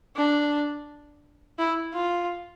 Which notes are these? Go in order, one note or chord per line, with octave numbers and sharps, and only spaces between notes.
D4
E4
F4